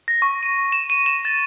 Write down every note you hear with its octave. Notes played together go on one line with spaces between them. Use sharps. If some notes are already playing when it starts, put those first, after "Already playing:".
A#6
C#6
D#7
E7
D#7
E7
A6